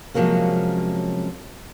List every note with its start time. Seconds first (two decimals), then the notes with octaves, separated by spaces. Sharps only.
0.14 C3 F3 F#3 G#3 A#3 C#4